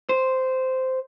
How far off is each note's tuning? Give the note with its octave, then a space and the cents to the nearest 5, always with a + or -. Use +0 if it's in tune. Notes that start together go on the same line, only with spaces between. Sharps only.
C5 -10